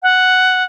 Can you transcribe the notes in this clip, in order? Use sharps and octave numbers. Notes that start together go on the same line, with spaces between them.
F#5